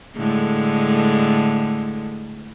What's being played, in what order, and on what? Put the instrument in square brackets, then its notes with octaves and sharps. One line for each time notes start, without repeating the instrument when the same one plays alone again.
[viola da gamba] A2 D3 G#3